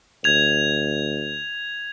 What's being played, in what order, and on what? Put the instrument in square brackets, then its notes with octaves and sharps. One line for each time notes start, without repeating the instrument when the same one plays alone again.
[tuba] D2 [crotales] G#6 F7